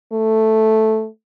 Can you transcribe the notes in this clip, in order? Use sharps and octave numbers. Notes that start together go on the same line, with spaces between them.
A3